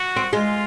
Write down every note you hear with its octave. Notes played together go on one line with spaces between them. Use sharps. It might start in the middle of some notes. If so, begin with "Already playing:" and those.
Already playing: F#4
C4
G#3 F4